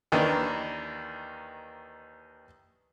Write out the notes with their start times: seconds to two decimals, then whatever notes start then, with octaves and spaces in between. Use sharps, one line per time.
0.12 D#2 D#3 E3 A#3 D4